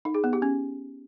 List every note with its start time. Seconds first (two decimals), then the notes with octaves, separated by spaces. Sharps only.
0.05 D#4
0.14 G#4
0.24 B3
0.33 G4
0.42 C#4